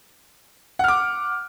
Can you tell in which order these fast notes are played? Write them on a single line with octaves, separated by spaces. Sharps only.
F#5 F6 D6